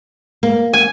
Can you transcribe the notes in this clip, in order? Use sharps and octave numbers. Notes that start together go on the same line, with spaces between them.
A#3
G#5